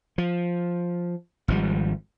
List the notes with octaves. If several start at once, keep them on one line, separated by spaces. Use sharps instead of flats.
F3
G#1 F3 G3